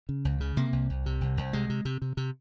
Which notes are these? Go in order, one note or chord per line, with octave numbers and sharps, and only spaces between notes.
C#3
C#2
C#3
C3 A#3
C2
C2
C3
C2
C2
C3 G#3
C3
C3
C3
C3